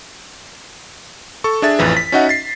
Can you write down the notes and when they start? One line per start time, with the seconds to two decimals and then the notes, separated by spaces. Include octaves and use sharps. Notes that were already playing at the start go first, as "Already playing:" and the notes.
1.44 A4 C#6
1.62 D4 G#4 E5 A6
1.79 A1 F2 E3 B4
1.97 B6
2.12 C#4 D#4 F#4 D#5 E5 F#5
2.29 A6 C7